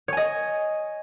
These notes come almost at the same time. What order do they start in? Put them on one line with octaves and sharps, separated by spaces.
C#5 G#5 D#5